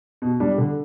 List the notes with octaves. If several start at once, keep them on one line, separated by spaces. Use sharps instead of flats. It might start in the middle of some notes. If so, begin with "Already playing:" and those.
B2
G3 D4
D3